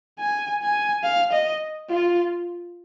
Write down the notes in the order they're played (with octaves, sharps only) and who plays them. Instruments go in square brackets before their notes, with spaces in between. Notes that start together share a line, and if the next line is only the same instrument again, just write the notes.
[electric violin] G#5
G#5
F5
D#5
F4